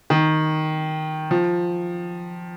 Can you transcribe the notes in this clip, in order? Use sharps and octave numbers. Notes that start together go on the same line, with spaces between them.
D#3
F3